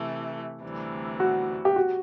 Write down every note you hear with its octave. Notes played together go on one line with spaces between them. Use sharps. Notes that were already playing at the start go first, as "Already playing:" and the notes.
Already playing: C3 E3 A3
D2 C3 E3 G3
F#4
G4
F#4